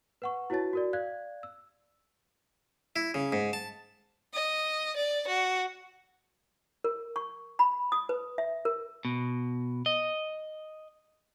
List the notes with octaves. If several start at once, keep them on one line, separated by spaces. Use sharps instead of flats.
B4 F#5 C#6
E4 F#4 B4 C#5 A5 A6
F#4 A#4 D5
D5 F5 F#6 G#6
E6
E4
C#3
G#2
A5
D#5
D5
F#4
A#4
C#6
B5
D#6
B4
E5
A#4
B2
D#5